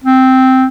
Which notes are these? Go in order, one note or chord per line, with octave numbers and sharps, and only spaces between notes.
C4